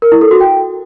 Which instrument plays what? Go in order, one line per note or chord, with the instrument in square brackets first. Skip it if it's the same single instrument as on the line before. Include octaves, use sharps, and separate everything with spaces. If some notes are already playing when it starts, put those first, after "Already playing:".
[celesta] A#4
E4
A4
F#4
G5